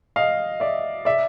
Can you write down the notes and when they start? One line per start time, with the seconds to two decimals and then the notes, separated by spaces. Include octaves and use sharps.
0.16 D#5 F5
0.60 D5 E5
1.05 D5 E5